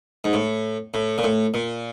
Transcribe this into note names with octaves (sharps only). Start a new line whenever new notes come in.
G#2
A2
A2
A#2
A2
A#2